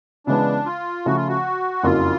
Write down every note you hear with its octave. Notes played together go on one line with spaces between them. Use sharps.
C#3 E3 G#3 B3 D4
F4
C#3 F3 A3 F#4
F4
F#4
F#1 F2 C#3 F#3 A#3 F4